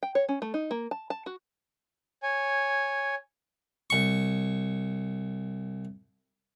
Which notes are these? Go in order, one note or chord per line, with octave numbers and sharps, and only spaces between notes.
G5
C#5
C#4
A3
D#4
A#3
A5
A5
F#4
C#5 G#5
C2 C#6